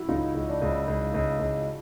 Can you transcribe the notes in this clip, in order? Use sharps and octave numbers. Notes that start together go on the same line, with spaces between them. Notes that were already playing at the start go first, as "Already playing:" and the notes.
Already playing: E4 F#4
C#2 D#4 F4
C#2
D4
C#2
C#2
C#2
C#2